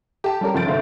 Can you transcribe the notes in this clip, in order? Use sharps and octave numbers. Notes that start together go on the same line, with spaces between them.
G4 A5
G3 C#4 G4 A#4
F#1 F2 G6 A6 D7
G1 D2 C3 A3 C5 F5